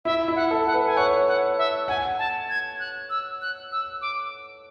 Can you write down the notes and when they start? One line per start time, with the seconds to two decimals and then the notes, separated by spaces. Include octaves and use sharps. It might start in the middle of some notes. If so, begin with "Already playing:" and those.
0.05 E4 E5
0.28 E4
0.35 F#5
0.51 A4
0.66 F#5
0.74 B4
0.86 G#5
0.97 C#5 F#5
1.27 F#5
1.58 E5
1.88 F#5 G#5
2.19 A5
2.50 G#6
2.80 F#6
3.10 E6
3.41 F#6
3.72 E6
4.02 D6